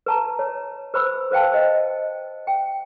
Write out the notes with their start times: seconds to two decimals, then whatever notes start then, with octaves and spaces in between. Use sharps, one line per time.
0.06 B4 A5 A#5
0.39 C#5
0.94 B4 C5 B5 E6
1.31 B4 C5 F5 G5 A5
1.52 C5 D#5
2.47 G5